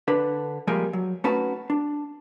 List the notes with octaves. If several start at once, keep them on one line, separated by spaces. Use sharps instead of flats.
D3 D4 B4
F3 G3 G#3 A#3 G4 G#5
F#3
A3 C#4 D#4 F#4 B4 A5
D4